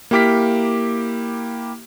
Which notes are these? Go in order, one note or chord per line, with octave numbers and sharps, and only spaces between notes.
A#3 E4 G4 D6 F6 B6